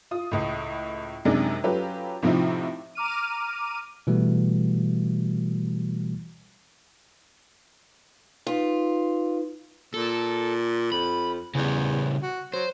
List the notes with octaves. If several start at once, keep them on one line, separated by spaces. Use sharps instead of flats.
F4 D#6
C#2 A2
F#2 C3 G#3 D4 D#4
F#3 C#4 F4 G4 A4 B4
A2 C3 F3 C4 D#4 E4
A#5 D6 F6 D#7
B2 E3 G3 A3 F#4
D#4 F4 B4
A#2 A4
F2 B5
E2 C#3 G3
F#4
F#3 C5